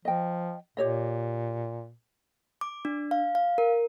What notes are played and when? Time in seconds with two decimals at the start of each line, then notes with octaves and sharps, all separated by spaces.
0.05 F3 D#5 G5
0.77 A#2 G4 C#5 D#5
2.61 D6
2.85 D4
3.11 F5
3.35 F5
3.58 A#4